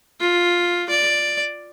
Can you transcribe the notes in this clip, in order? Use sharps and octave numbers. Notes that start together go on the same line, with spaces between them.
F4
D5